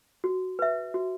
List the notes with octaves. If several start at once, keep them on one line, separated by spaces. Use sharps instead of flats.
F#4
B4 E5
F#4